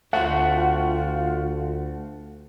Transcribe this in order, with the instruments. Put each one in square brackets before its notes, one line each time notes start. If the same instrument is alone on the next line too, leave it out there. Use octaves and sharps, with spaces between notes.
[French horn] D2 [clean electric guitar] A3 C4 F#4 [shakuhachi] F4 [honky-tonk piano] F#5